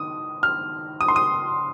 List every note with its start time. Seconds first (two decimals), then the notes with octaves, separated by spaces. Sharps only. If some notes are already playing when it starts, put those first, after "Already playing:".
Already playing: D#3 D#6
0.43 F6
1.01 D#6
1.08 C6
1.16 D#6